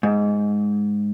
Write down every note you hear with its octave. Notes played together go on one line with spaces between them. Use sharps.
G#2